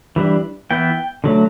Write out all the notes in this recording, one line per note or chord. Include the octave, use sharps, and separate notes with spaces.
E3 G3 D4
E3 B3 E4 G5
D3 F#3 A3